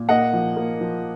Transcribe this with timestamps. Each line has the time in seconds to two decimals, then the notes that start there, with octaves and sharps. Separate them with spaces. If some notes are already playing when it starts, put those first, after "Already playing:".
Already playing: A#2
0.09 A#3 D#5 F#5
0.33 F3
0.56 A#3
0.80 F3